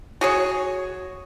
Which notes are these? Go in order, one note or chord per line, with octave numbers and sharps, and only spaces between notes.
F#4 G#4 C#5